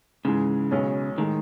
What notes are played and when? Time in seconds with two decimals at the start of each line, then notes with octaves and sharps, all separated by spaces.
0.25 G#2 C#3 E3 G#3
0.71 B1 B2 G#3 C#4
1.18 A2 D#3 G#3 D#4